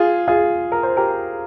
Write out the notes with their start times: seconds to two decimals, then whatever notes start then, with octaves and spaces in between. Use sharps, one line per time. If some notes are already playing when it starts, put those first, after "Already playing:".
Already playing: F4 G#4
0.28 F4 G#4
0.72 A#4
0.83 C5
0.97 G4 A#4